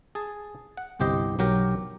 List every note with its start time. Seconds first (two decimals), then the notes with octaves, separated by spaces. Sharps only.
0.15 G#4 A5
0.77 F#5
1.00 G1 C2 G4 C5 D#5
1.39 B1 F#3 G4 A#4 G5